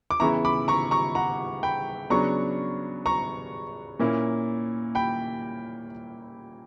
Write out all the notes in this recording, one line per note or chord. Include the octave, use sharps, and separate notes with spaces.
D6
C#3 E3 B3 E4 A#5 C#6
B5 D6
A#5 C#6
A#5 C#6
F#5 A#5
G5 B5
C#3 F#3 B3 D4 A#5 C#6
A#5 C#6
A#2 A#3 C#4 E4
G5 B5